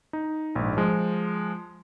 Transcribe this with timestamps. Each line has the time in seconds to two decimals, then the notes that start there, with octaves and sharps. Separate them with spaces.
0.13 D#4
0.56 A#1 G#2
0.77 F3 G#3